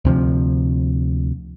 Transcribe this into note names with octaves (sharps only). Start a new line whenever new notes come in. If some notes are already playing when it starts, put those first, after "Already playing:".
D2 C3 F3